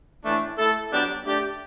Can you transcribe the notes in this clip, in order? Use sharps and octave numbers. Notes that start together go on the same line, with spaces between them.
A2 E3 A3 D4
A3 E4 A4
F#3 B3 D4 G4 D5
A3 D4 G4 D5